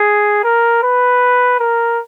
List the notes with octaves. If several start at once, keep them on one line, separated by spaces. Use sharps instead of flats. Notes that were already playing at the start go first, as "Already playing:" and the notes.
Already playing: G#4
A#4
B4
A#4